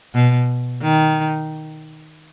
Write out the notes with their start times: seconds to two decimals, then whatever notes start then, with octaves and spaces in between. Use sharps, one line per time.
0.14 B2
0.82 D#3